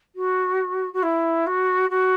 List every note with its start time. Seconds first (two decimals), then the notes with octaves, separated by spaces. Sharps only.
0.16 F#4
0.93 F#4
1.03 E4
1.47 F#4
1.90 F#4